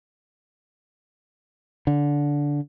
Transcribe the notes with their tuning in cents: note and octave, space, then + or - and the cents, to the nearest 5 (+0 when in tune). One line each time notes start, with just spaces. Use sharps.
D3 -15